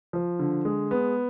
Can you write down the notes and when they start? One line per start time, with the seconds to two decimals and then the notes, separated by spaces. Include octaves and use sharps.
0.13 F3
0.39 D3
0.65 G#3
0.91 B3